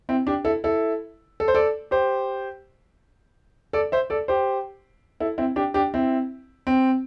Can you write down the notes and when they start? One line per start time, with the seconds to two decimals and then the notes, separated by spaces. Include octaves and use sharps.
0.09 C4 E4
0.27 D4 G4
0.45 E4 A4
0.64 E4 A4
1.40 A4
1.48 C5
1.55 A4 D5
1.91 G4 C5
3.73 A4 D5
3.92 C5 E5
4.10 A4 D5
4.28 G4 C5
5.20 E4 A4
5.38 C4 E4
5.56 D4 G4
5.74 D4 G4
5.94 C4 E4
6.67 C4